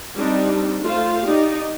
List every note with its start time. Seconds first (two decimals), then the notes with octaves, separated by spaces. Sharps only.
0.16 G3 C4 D4 D#4
0.81 A3 F4 C5 F5
1.24 D#4 G4 D5